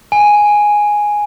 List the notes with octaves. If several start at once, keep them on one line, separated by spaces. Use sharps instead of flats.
G#5